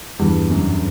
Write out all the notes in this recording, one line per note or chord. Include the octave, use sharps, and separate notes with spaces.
E2 G2
F#2